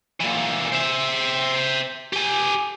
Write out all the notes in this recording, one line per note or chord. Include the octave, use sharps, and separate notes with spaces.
A#2 E3
C5 E5
G4 G#5